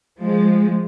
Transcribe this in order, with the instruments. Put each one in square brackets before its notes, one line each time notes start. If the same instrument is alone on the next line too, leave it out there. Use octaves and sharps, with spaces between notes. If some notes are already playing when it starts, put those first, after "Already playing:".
[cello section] F3 G#3